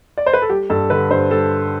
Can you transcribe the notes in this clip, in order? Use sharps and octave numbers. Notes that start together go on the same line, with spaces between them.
D5
C5
B4
A4
G3 G4
G2 A4
D3 B4
G2 C5
G3 A4